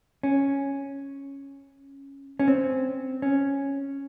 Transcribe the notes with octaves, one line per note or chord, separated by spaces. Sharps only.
C#4
C#4
C4
C#4